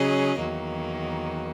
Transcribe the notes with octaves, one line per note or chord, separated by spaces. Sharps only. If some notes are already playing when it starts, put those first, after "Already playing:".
Already playing: C#3 F#3 C#4 G#4 D#5
E2 D#3 F#3 A#3